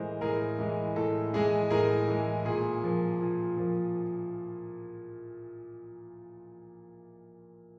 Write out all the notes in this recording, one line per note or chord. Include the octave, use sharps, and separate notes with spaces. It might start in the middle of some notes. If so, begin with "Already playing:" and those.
Already playing: A2 E3 G#3 A#4 C5
A2 G#4 A#4
E3 G#3
A2 A4
E3 G#3 G#4
A2 G#4 A#4
E3 G#3
A#2 G#4
F3 A#3
A#2
F3 A#3